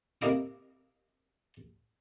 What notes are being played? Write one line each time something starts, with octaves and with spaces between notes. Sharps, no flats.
C3 A#3 E4 D#5 F5 D6